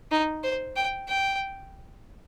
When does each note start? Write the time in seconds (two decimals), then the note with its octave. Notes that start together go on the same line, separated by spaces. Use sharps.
0.11 D#4
0.43 C5
0.76 G5
1.08 G5